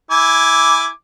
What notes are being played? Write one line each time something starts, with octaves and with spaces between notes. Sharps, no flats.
E4 G#5 D6